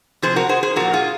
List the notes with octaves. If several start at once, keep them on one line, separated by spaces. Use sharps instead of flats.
C3 F3 G#4 C5
F#4 A#4
G#4 C5
G#4 C5
A#2 F3 F#4 A#4
F4 G#4